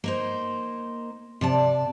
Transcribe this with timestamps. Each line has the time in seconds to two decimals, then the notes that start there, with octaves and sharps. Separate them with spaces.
0.04 A#3 D#4 C5
1.41 C3 D5 A5